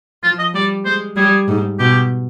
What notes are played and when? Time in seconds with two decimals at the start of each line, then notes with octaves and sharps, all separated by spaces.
0.23 F3 F4
0.39 D#5
0.54 G3 D5
0.85 G#3 C5
1.16 G3 G#4
1.48 G#2
1.79 B2 G4